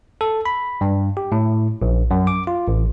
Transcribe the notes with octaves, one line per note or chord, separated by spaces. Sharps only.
A4
B5
G2
G4
A2
A#1
F#2
D6
F4
A1